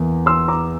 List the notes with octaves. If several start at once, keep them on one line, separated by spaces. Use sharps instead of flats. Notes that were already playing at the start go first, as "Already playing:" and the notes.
Already playing: E2 E3 A#3
C6 E6
A#5 D6